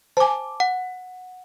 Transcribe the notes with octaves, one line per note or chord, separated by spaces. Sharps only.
C5 G#5 A5 D6
F#5